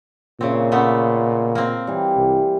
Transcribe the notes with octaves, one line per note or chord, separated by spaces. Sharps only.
A#2 C#3 C4 C#5 E5
C#3 A3 B3 D#5
A#3 C4
E3 G3
C2